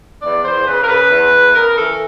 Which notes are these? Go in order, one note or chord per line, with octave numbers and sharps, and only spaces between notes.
E2 D5
E2 C5
C#3 B4
A#4
C#3 B4
E2
E2
C#3 A#4
E3 A4